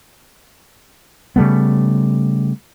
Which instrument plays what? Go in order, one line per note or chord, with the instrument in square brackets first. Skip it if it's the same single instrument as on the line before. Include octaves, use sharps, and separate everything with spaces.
[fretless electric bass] C#3 G3 A3 B3